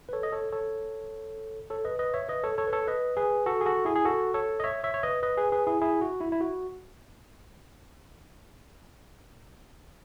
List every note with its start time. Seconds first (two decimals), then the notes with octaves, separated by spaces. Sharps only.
0.09 B4
0.13 A4 C#5
0.23 D#5
0.32 A4 C#5
0.52 A4 C#5
1.70 A4 C#5
1.85 B4 D#5
1.99 B4 D#5
2.14 C#5 E5
2.29 B4 D#5
2.44 A4 C#5
2.58 A4 C#5
2.67 B4
2.73 A4 C#5
2.87 B4 D#5
3.17 G#4 B4
3.46 F#4 A4
3.61 G#4
3.66 F#4 A4
3.85 E4 G#4
3.96 G#4
4.05 F#4 A4
4.34 A4 C#5
4.60 D#5
4.64 C#5 E5
4.84 C#5 E5
4.94 C#5
5.03 B4 D#5
5.23 B4 D#5
5.37 G#4 B4
5.52 G#4 B4
5.67 E4 G#4
5.81 E4 G#4
6.01 F#4
6.21 E4
6.32 E4
6.41 F#4